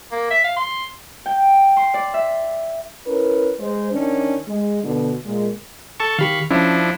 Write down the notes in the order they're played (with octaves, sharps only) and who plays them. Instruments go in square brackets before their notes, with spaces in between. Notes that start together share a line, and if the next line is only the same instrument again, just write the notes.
[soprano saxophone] A#3
E5
F5
C6
[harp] G5
C6
D5
E5
[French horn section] C#4 E4 A#4 B4
G#3 C5
D#3 C#4 D4
G#3
B2 D3
A#2 G#3
[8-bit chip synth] A4 A5 C#6
[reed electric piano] D#3 G4 [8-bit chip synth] F5 B5 C#6
[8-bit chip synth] F3 D4 E4 [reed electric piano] C#4